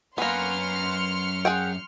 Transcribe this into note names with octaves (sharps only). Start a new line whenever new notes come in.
F#2 A#3 B3 G#5 C6 F6 C#7
G#4 F#5 G5